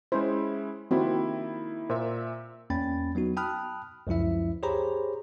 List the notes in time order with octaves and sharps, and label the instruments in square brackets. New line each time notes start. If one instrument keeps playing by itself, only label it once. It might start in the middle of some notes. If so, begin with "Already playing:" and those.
[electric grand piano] G#3 C#4 E4 [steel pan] C5
[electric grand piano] D#3 A#3 E4 [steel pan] C4 F#4
[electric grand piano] A#2 E5 [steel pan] A#4 C5
[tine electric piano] E2 A#3 C#4 G5 B5 A6
F#3 B3 D#4 F#4
G5 A5 B5 D#6 F6 F#6
C#2 F#2 F3 E4 E5
G4 G#4 C5 C#5 A#5 B5